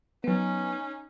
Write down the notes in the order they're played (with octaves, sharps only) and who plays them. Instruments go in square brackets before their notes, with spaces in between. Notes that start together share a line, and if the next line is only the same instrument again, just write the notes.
[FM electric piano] F#3 B3 [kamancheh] C#4 D#4